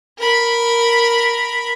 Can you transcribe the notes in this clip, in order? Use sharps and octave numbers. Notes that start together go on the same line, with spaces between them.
A#4 B5